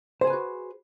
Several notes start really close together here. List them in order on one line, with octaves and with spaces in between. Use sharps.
C5 G#4 G#5 B4 F#4